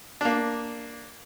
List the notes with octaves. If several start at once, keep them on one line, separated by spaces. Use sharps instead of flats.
A#3 D4